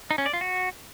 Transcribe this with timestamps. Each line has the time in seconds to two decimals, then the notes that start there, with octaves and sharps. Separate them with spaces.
0.11 D#4
0.18 C#4
0.26 D5
0.33 F4
0.41 F#4